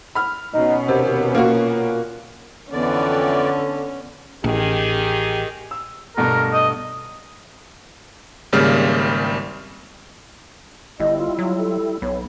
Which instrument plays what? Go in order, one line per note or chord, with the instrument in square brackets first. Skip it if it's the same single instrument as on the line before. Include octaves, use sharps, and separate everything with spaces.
[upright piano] B5 F6
[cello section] B2 B3 C#4 [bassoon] D#4
[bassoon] D#2 [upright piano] C3
[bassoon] A#2 [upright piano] A#3 F#4
[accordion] F2 E3 D5 [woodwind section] D3 [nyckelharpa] B3 [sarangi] C#4
[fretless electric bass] A1 [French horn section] D#3 G4 G#4
[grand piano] E6
[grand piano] G2 B2 A3 [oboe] A#4
[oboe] D#5
[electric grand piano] G#1 C#3 G3 A#3 F6
[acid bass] G1 [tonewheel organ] G3 E4 [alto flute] D#5
[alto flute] F4
[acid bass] F#3 [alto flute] F4
[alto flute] A4
[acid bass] B1 [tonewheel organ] B3 [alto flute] C#5